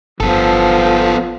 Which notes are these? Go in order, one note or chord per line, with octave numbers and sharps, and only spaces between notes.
G1 F3 B3 A4